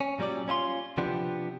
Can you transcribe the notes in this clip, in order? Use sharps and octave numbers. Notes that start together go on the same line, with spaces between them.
C#4
A#2 F#3 G3 C#4 D5
C#4 E4 F4 C6
C3 F3 B3 D4 G4